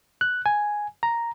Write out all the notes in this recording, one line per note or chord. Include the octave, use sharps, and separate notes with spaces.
F#6
G#5
A#5